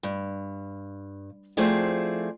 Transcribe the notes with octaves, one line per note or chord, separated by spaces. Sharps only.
G2
F3 A3 C4 E4 G#4 D5